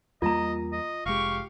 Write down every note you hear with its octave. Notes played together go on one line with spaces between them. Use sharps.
E2 G3 A#3 F4 D#5 A#5
D#5
F1 G#3 G4 F5 C#6